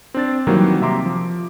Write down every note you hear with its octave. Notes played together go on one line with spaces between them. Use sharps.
C4 D4 A6
D#3 E3 F#3 G3 A#3 C4
C3 E5 A#5 C6 D6
F3